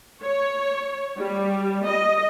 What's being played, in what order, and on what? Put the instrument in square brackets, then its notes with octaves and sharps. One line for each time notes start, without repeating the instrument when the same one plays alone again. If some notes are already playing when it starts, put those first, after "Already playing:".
[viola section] C#5
G3
D#5